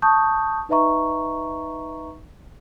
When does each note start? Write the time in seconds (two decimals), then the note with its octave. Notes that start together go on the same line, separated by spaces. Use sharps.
0.02 A5 C#6 D#6 G6
0.69 D#4 B4 D#5 E5 A#5 C#6